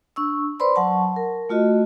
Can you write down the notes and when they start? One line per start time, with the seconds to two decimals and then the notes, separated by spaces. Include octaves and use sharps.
0.16 D4 C#6 E6
0.60 B4 C5 D5 B5 C6
0.75 F#3 F#5 A5 C#6
1.16 A#4
1.49 A3 F4 F#4 D#5